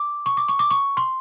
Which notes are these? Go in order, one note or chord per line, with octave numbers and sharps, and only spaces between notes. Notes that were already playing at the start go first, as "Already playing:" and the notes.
Already playing: D6
C#6
D6
C#6
D6
C#6
C6